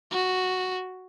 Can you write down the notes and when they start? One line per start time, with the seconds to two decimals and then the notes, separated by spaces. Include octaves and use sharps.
0.11 F#4